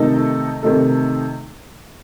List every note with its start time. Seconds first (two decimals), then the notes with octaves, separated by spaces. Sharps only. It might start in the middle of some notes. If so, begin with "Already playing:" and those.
Already playing: C3 D#3 A3 D#4 A4
0.63 C3 D#3 A3 D#4 A4